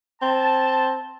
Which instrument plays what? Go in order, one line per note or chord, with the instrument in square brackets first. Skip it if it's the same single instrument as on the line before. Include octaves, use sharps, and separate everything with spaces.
[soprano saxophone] C4 [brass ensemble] A5